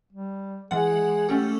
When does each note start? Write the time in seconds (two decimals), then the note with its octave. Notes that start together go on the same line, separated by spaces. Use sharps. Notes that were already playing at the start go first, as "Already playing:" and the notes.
0.13 G3
0.71 E3 G#3 G#4 F#5
1.29 A3 C#4 G4 A4